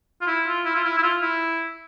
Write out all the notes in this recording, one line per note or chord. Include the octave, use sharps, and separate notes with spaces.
F4
E4
F4
E4
F4
E4
E4
F4
E4